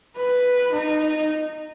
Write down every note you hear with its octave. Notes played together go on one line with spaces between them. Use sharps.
B4
D#4